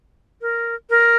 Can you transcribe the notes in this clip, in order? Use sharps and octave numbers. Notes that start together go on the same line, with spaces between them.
A#4
A#4